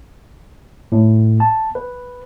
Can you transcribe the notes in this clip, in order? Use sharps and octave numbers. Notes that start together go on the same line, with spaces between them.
A2
A5
B4